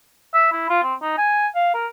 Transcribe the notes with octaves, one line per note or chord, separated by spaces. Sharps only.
E5
E4
F4
C4
D#4
G#5
F5
A#4